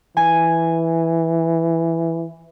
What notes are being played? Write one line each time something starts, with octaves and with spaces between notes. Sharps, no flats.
E3 G#5